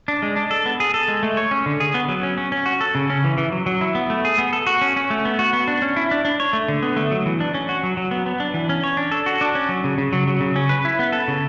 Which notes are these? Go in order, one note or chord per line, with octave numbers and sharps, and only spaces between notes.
D4
G#3
D4
A4
B3
G#4
A4
G#3
A3
C#5
C#4
D3
G#4
B3
F#3
C#4
C#4
C#4
F#4
A4
C#3
C#4
E3
E3
F#3
F#3
E4
B3
A3
G#4
B3
A4
F#4
C#4
C#4
A3
B3
F#4
B3
D4
C#4
E4
D4
D4
C#5
A3
D3
B3
A3
F#3
E3
D4
C#4
F#4
F#3
F#3
B3
B3
D4
E3
C#4
C#5
D4
A4
F#4
D4
C#4
F#3
C#3
C#3
F#3
F#3
C#3
C#4
B4
E4
B3
A4
C#3